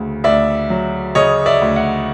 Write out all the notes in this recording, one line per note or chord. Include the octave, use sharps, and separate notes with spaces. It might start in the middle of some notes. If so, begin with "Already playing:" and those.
Already playing: D2 C#3
D2 D5 E5
F#3
C#3 C#5 D#5
D5 E5
D2
E5 F#5